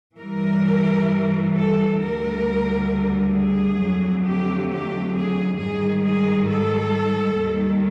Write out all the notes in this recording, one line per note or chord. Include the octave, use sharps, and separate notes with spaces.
G2 E3 G3 A#4
A4
D2 D3 G3 A#4
G#4
F2 D3 F#3 A3
G4
G4
G#4
G#2 D#3 G3 G#4
G#4
A4
D#2 D#3 G3